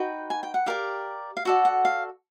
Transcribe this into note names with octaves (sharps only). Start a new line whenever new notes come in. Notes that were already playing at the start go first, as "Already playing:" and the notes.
Already playing: D#4 F#4 B4 G5
G#5
G5
F#5
G4 A#4 D5 F5
F5
F#4 A4 D5 F#5
F#5
F5